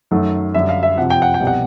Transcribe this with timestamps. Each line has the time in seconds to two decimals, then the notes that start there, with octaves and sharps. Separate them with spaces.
0.11 F#2 D#3 F#3 A3
0.54 F#2 D3 G3 E5
0.69 F5
0.83 E5
0.97 F2 C3 F3 F#5
1.10 G5
1.22 F#5
1.34 G5
1.40 C2 B2 G3
1.47 F#5